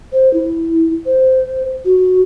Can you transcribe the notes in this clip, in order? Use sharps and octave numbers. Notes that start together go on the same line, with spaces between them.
C5
E4
C5
F#4